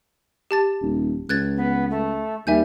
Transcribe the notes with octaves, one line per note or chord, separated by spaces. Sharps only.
G4 A5 A6
D#1
C#2 F#6 G#6 A6
B3
A3
D#2 G3 E5 G#5 G6